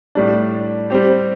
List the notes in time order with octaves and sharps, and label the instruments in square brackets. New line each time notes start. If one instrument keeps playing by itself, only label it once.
[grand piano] A2 G3 D4
G3 C4 G4